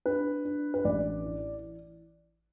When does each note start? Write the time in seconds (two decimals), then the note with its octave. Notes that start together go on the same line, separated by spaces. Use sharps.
0.06 D4 B4
0.45 D4
0.74 B4
0.85 A1 D5
1.24 E3